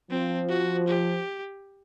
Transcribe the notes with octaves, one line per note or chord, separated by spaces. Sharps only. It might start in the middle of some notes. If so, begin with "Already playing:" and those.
F3 C4
F#4
G4